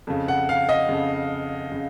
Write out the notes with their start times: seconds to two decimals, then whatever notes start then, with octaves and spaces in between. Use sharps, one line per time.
0.07 F2 C#3
0.28 F#5
0.49 F5
0.69 D#5
0.89 F2 C#3
1.72 C#3